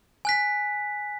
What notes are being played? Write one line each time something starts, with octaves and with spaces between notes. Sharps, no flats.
G#5 F#6 B6